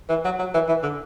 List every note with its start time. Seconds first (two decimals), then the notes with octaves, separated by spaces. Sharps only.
0.09 E3
0.25 F#3
0.39 F#3
0.54 E3
0.68 E3
0.83 D3